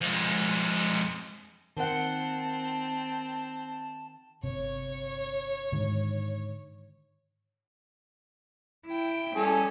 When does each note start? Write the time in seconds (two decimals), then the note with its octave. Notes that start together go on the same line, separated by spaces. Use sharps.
0.01 F2 G#3
1.77 D#3 C4 F#5 A5
4.43 G1 C3 C#5
5.72 G#2 D3 D#3
8.86 E4 G5
9.36 G3 C#4 G#4 A4